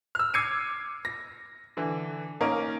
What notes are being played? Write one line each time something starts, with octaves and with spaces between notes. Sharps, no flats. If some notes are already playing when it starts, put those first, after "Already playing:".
E6 F6
D6 E6 G#6 C7 C#7 D#7
A#6
D3 E3
A#3 C#4 D#4 A#4